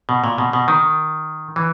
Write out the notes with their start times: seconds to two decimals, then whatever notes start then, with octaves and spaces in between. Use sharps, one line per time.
0.09 B2
0.24 A#2
0.38 B2
0.53 B2
0.68 D#3
1.56 E3